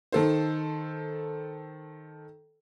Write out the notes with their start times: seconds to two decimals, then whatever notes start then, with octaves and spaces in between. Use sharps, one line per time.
0.12 D#3 A4 C5